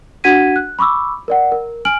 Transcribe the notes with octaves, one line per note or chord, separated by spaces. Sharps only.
D4 F#4 F#5 G#6 B6 D#7
F#6
B5 C#6 D6 E6
A#4 D5 F#5
A#4
G#5 F6 D7 F#7